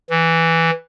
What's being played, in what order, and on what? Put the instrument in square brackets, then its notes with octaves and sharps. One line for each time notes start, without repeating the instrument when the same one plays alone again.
[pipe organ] E3